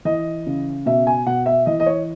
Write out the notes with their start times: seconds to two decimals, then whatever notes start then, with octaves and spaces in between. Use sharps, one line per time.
0.05 E3 D#5
0.47 C#3
0.86 B2 E5
1.07 G#5
1.26 B2 F#5
1.46 E5
1.66 E3 D#5
1.80 D#5
1.86 C#5